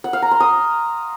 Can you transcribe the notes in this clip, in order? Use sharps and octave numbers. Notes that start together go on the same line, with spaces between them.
F#5
F5
A#5
C6
D#6